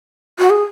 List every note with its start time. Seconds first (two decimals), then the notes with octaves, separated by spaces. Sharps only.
0.39 F#4
0.50 G#4